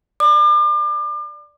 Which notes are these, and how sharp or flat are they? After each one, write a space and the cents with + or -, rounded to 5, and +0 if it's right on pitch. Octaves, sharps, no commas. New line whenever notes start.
D5 +0 D6 +35